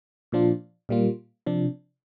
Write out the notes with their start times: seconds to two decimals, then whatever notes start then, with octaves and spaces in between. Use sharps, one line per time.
0.32 A#2 F3 D4 F4
0.89 A#2 G3 A#3 F4
1.46 C3 F3 D4